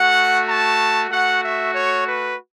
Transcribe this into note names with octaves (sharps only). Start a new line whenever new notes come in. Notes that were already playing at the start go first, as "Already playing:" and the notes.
Already playing: A3 F#4 F#5
A5
A3 F#4 F#5
E5
C#5
B4